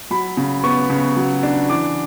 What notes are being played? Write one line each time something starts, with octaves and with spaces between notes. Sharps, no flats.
F#3 B5
C#3
B3 C#6
C#3
F#3
D4
E3 D6